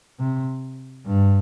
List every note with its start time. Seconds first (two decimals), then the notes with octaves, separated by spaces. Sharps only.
0.19 C3
1.06 G2